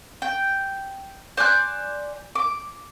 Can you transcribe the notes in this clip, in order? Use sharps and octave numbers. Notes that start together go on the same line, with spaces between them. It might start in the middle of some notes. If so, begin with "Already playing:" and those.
G5
C5 D5 G#5 F#6
D6